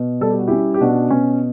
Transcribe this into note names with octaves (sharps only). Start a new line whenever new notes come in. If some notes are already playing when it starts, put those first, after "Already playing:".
Already playing: B2
G3 A4
G4
F#4
C#4 E4 G4
G4
B2 D4 F#4
B2 C#4